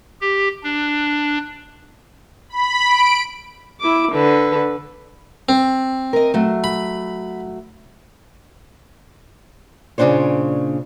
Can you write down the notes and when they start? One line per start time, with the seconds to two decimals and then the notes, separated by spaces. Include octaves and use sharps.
0.21 G4
0.63 D4
2.49 B5
2.87 D7
3.81 E4 D6
4.12 D3 B4
5.49 C4
6.13 A#4 D#5
6.34 F#3 A3
6.64 B5
9.98 A#2 C#3 E3 D4 C5 C#5